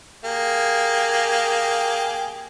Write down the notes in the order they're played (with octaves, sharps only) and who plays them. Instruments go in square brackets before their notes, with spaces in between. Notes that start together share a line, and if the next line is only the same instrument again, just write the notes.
[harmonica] A#3 G4 G#4